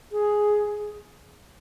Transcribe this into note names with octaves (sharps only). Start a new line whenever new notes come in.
G#4